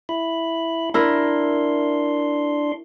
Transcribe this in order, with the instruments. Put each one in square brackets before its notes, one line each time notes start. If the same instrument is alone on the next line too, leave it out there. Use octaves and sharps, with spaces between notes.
[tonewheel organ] E4 B5
[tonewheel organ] D4 C6 [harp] E4 A#4